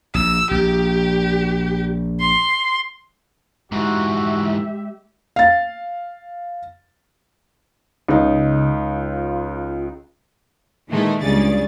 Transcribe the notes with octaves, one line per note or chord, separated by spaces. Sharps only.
A#1 E6
A#1 G4
C6
G#2 E3 G#3 F#4 G4 E5
F5 A6
C#2 C#3 D#4
F4
A#2 D#3 E3 G#3 A3
C#2 G2 C#3 G#4 D5 A6